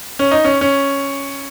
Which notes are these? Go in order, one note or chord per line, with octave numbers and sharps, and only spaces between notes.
C#4
D#4
C#4
C#4